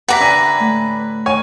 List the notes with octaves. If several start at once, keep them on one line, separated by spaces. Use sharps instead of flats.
G4 B4 E5 F#5 A#5 D6 B6
D3 D4 G#5
A2 A3
D#3 C#5 G#5